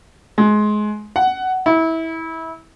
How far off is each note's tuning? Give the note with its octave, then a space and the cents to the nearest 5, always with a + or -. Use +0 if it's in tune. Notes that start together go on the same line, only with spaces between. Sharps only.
G#3 +20
F#5 +15
E4 -20